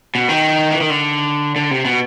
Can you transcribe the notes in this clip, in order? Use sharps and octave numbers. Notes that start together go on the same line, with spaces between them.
B2
D#3
E3
D#3
D3
D3
C3
B2